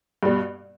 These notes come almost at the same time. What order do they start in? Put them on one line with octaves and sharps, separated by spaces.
G2 G3 B2